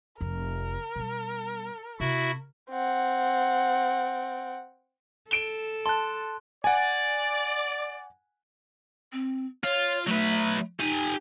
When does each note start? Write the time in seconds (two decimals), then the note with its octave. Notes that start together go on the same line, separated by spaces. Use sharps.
0.21 F1 F2 A#4
0.96 B2 G3
2.00 C3 E4 F#4 E5
2.71 C4 F#5
5.31 A4 D7 E7 G7
5.86 A5 C6 F#6
6.64 D5 F#5 G#5
9.12 C4
9.64 F4 C#5
10.07 F#3 A3 B4
10.80 D#4 G4 G#5